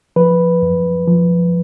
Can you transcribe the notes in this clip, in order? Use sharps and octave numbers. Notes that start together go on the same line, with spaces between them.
F3 B4
F#2
F3